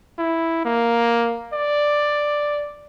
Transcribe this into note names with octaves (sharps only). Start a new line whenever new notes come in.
E4
A#3
D5